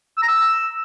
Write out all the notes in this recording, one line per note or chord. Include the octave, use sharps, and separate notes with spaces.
E6
A#5
E6